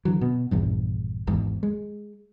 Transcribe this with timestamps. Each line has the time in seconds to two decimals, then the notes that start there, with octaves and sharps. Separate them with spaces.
0.05 D3 E3 F#3
0.21 B2
0.51 A#1 E2 G2
1.27 G#1 E2 G#2
1.63 G#3